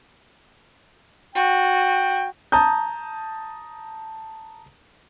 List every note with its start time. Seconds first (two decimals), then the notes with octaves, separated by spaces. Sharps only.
1.35 F#4 G5
2.52 A5 A#5 D#6 G6